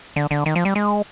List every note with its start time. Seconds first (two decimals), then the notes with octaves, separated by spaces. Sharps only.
0.16 D3
0.31 D3
0.46 D#3
0.55 F3
0.65 G3
0.75 G#3